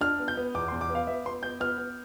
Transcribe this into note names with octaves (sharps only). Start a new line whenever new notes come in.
D4 F6
B3
G6
B3
E2 D6
C6
E2
D6
B3
F5
B3 E5
B3 C6
B3 G6
B3 F6
B3